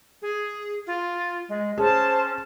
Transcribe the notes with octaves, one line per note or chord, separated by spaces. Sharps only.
G#4
F4
G#3
C#4 G#4 C5 A5